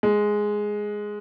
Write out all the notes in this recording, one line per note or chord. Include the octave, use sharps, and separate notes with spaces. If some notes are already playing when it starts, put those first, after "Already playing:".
G#3